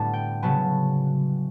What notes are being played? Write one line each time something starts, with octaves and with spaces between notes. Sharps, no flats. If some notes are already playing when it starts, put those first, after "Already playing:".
Already playing: A2 D3 G3 A3 B3 A5
G5
C#3 F#3 B3 A5